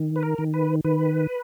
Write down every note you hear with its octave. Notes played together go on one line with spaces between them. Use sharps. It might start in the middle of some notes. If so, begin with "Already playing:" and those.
Already playing: D#3
B4
A#4
D#3
B4
D#3 B4